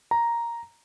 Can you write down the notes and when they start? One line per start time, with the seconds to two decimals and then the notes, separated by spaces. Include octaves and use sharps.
0.11 A#5